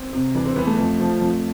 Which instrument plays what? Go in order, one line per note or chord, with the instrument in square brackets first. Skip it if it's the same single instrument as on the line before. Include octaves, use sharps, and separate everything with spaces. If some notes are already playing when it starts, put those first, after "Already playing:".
Already playing: [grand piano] C4
C3
E3 D4
C4
E3 B3
A3
F2
F3
F2